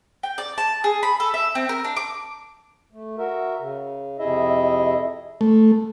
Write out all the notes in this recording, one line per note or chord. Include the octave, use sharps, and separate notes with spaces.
G5
D5
A5
G#4
B5
A4
E5
C4
A#4
D4
D6
A3
F#4 A#4 E5
C#3
F2 C3 E4 G#4 D#5 E5
A3